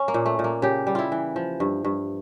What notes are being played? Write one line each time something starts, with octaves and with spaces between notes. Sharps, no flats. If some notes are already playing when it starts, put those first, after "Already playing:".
Already playing: C#4
A#3
A#2
A3
A#2
A#3
C#3 G4
G3
E4 F4
E3
F3
G2
G2